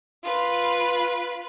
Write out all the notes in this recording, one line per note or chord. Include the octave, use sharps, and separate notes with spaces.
F4 B4